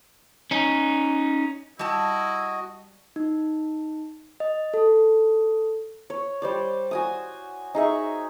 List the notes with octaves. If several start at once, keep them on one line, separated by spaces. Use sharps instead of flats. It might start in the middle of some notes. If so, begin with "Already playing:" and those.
C#4 D#4
G3 E4 F#4 D#5 A5
D#4
D#5
A4
C#5
G3 C5 D5
F#4 G#5 D#6
D#4 G#4 E5 C#6